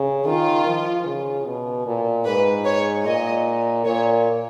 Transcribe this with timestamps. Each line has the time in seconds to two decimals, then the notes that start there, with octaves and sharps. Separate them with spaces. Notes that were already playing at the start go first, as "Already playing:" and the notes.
Already playing: C#3
0.26 D#3 F4
0.66 F3
1.06 C#3
1.46 B2
1.86 A#2
2.26 G#2 B4
2.65 C#5
3.06 A#2 D#5
3.86 A#2 C#5